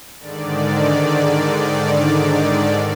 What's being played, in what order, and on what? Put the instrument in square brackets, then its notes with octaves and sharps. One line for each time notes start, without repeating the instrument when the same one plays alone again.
[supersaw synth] G#2 D3 D#3 D5